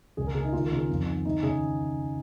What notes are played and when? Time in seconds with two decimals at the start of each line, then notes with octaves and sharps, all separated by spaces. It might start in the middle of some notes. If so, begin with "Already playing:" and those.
0.17 C#2 G#4
0.27 A#4
0.35 C#3 G#4
0.44 D#4
0.53 D#2 F4
0.66 A#4
0.72 C#3 G#4
0.89 F2
1.07 D#3
1.25 D#2 D#4
1.43 C#3 G#4